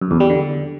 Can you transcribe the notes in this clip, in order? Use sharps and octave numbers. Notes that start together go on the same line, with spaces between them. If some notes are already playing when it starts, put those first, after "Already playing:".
F#2
E2
G3
D3